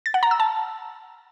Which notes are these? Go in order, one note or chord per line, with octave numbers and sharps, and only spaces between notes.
A6
F#5
A#5
E6
A5